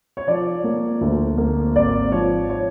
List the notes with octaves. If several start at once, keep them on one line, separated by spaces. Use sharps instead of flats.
C#5
F3 D5
A#3
D2
A#3
G#1 D5
F3 C#5
C#5